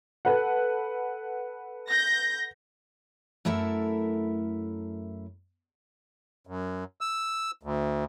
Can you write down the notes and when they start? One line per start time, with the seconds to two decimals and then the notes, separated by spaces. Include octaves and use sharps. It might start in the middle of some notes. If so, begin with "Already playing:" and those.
0.25 A4 B4 F#5
1.88 G6 A#6
3.45 F#2 A3 E4 A4 A#4 E5
6.47 F#2
7.01 E6
7.63 D2